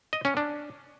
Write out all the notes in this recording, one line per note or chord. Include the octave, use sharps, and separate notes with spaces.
D#5
C#4
D4